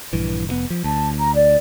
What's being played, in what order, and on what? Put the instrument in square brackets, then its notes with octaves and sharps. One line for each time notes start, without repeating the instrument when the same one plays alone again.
[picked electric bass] A#1 G2 E3
F1 A#2 B3
F3
[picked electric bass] D2 [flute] A5
[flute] A#5
D5